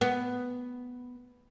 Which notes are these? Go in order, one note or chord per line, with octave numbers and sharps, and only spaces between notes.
B3